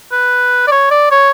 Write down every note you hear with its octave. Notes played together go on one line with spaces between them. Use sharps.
B4
D5
C#5
D5
C#5